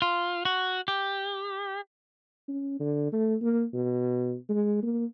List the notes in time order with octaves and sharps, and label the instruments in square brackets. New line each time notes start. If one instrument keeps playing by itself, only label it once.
[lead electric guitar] F4
F#4
G4
[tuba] C#4
D3
A3
A#3
B2
G#3
A#3